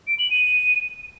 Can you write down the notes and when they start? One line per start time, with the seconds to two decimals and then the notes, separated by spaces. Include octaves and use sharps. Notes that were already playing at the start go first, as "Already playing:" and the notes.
0.07 D7
0.19 F#7
0.30 D#7